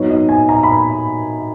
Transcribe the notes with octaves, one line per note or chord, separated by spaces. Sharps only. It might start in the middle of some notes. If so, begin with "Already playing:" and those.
Already playing: G#2 F#3 B3 D#4 C#5
D#5
G#5
A#5
B5